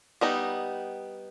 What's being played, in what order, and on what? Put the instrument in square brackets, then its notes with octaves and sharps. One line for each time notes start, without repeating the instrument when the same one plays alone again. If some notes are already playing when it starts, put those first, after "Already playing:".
[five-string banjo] G3 B3 D#4